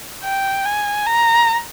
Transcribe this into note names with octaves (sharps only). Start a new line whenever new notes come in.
G5
G#5
A#5